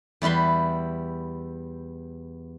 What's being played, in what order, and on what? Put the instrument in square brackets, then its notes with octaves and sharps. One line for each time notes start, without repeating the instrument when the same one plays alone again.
[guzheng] E2 G3 E4 B4 C6